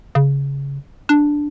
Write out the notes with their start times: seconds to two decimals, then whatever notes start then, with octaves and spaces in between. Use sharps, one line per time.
0.15 C#3
1.09 D4